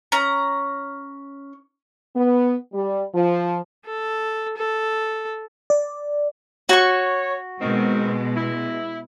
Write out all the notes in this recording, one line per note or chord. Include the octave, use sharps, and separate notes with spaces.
C#4 A#5
B3
G3
F3
A4
A4
D5
F#4 C#5 C#6
B2 D#3 G#3 C4
E4